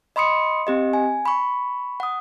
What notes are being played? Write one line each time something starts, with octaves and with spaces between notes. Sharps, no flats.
D#5 B5 C6 D#6 C#7
C4 G4 D#5
G#5
B5 C#6
F#5 D#6